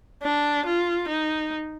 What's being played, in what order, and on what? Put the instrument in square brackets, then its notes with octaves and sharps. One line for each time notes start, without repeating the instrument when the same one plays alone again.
[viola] D4
F4
D#4